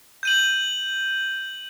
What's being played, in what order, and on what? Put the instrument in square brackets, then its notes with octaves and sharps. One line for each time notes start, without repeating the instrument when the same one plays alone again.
[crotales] G6 D#7 F#7